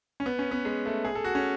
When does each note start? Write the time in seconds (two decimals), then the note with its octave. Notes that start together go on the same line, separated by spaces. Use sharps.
0.20 C#4
0.26 B3
0.39 C#4
0.51 B3
0.65 G#3
0.85 A3
1.05 G#4
1.15 A4
1.24 F#4
1.35 C#4